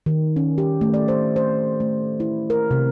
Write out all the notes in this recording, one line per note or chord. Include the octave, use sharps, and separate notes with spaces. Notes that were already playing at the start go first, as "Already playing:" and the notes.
D#3
C#4
G4
A3
D5
C5
C5
A3
E4
A#4
C3